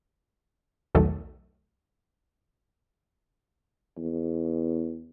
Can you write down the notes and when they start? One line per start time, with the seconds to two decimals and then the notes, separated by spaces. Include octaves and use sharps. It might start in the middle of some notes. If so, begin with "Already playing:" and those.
0.95 B1 E2 D#3 F#3 A3
3.97 E2